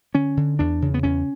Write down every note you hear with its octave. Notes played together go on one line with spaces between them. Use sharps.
D3 C#4
D3
E2 D4
C#3
B3
E2 C#4